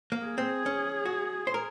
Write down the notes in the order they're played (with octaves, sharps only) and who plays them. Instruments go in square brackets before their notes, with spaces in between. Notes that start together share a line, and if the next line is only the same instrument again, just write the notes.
[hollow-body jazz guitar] A#3
[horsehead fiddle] G#4
[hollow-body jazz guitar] C4
C#4
F#4
C5
A#4